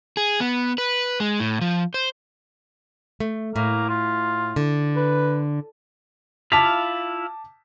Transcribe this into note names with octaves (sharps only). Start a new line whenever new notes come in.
G#4
B3
B4
G#3
A2
F3
C5
A3
A2 A#3
F4
D3
B4
E4 F4 F5 A5 D6 B6